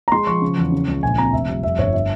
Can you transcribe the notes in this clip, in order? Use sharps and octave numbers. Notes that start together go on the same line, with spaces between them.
A#5
G#3 C6
F3 C#6
C#3
E2
C#3
C#2
A#1 G#5
C4 A#5
F1 E5
G3
F2 E5
G1 C#5
E5